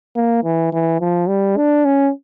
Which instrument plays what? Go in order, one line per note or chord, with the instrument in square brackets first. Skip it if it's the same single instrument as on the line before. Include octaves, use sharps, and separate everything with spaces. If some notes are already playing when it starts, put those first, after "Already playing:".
[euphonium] A#3
E3
E3
F3
G3
D4
C#4